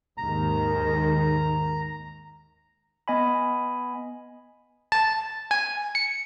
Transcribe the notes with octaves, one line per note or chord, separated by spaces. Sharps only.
D#2 G#2 D#3 A#5
B3 D#5 G#5 B5
A5
G#5
C#7